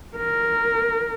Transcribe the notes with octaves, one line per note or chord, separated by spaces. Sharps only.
A#4